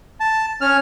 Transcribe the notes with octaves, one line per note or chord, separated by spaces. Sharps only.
A5
C#4 F6